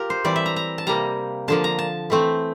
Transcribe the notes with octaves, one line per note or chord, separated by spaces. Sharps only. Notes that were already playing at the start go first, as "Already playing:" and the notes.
Already playing: F4 G4 A#4
C5
E3 G3 C4 D5
E5
A#5
A#5
A5
C3 G3 A#3 A#5
D3 F3 A#3 A5
A#5
A5
E3 A3 C4